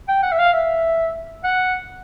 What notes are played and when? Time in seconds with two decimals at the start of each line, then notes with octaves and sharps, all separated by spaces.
0.08 G5
0.23 F#5
0.32 E5
0.39 F5
0.53 E5
1.44 F#5